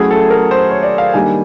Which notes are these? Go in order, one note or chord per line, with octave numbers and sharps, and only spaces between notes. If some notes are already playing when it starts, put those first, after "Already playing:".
Already playing: F#3 A3 C#4 E4 G#4
A4
A#4
C5
C#5
D5
F5
D#3 G3 A#3 D4 G#5